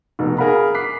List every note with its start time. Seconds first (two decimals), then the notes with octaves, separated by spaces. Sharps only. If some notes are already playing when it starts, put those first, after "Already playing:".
0.19 F1 B2 D#4
0.38 G#4 A#4 F5 F#5 B5
0.75 D6 F#6 B6 C7